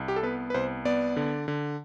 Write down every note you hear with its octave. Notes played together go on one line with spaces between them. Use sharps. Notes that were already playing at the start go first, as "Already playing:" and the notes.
Already playing: C2
G4
A4
B3 B4
B4
C2 C5
B3 D5
D3
D3